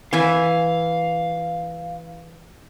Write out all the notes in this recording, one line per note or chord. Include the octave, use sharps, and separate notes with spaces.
E3 E5 F5 G#5